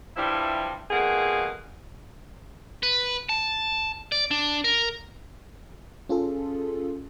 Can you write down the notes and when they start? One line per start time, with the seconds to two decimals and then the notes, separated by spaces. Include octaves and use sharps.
0.16 G2 F3 G3 E4
0.90 F2 B2 A#3 G#4 F#5
2.83 B4
3.29 A5
4.12 D5
4.31 D4
4.64 A#4
6.09 C#4 F4 G#4 A4